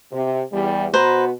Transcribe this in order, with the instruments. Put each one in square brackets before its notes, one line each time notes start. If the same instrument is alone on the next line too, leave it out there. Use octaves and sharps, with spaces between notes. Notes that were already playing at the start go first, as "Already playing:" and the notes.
[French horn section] C3
E2 G3
[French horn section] B2 B3 F#4 [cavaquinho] B4 C5 A#5